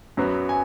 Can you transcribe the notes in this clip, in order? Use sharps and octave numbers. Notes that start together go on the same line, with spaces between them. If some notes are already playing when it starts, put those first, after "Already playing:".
F#2 F#3 B3
G#5